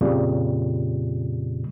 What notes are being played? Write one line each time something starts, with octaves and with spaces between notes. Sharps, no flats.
F2 A#2 C#3 G3